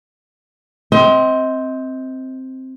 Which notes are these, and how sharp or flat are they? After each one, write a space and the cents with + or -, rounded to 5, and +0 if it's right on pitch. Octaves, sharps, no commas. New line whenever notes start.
C4 +0 D#5 +35